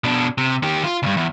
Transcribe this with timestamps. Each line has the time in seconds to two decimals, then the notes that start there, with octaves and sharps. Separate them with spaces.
0.04 B2 D4
0.38 C3
0.63 D#3 G4
0.84 F4
1.03 C#2 G2
1.17 E2